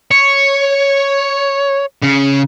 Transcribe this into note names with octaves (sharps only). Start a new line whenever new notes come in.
C#5
C#3